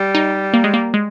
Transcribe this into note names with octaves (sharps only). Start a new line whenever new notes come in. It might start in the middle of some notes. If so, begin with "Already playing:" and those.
Already playing: G3
D#4
A#3
G#3
A#3
G#3